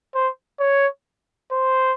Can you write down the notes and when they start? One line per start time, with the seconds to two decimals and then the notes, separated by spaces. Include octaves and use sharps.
0.15 C5
0.59 C#5
1.52 C5